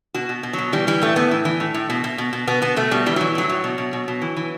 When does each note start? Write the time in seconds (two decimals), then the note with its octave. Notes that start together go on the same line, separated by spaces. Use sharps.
0.14 B2 F#4
0.29 B2
0.43 B2
0.53 B2 F#3
0.72 E3 G3
0.87 E3 G3
1.01 A2 A3
1.16 A2 B3
1.31 E3
1.45 E3
1.60 A2
1.74 A2
1.90 B2
2.04 B2
2.18 B2
2.33 B2
2.47 B2 B3
2.62 B2 B3
2.76 B2 A3
2.91 B2 G3
3.06 E3 G3
3.16 E3 F#3
3.35 A2 F#3
3.49 A2
3.64 B2
3.78 B2
3.93 B2
4.08 B2
4.22 E3
4.37 E3